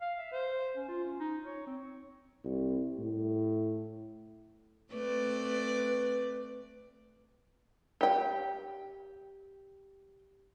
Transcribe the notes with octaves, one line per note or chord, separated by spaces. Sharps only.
F5
E5
C5
C#4
F4
C#4
D#4
C#5
C4
C2
A2
A3 C4 B4 D5
G4 G5